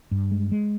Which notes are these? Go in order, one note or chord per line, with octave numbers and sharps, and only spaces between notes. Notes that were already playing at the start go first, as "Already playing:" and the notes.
G2
G#3
G#3